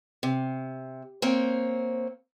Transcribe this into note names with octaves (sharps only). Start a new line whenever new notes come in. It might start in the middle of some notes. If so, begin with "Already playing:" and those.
C3
A#3 C4 C#5